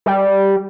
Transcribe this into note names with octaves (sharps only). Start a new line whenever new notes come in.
G3